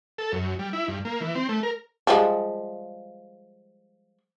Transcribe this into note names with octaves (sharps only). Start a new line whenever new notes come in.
A4
F#2
G3
E4
G2
A#3
E3
C4
A3
A#4
F3 G3 G#3